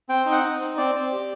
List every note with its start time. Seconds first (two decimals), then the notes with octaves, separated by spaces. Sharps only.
0.09 C4 G5
0.26 D#4
0.32 F#5
0.43 D#4
0.61 C4
0.77 C4 D5
0.95 C4
1.12 G4